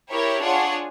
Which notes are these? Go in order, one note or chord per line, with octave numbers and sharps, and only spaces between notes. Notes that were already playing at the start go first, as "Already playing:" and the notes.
E4 G4 A#4 C#5
D4 F4 G#4 C#5 F#5